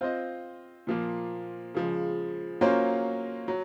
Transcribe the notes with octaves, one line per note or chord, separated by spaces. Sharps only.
C4 F4 C5 D#5
A#2 F3 A#3 F4
C#3 F3 G#3
F#3 A#3 C#4 F4 C5
F#3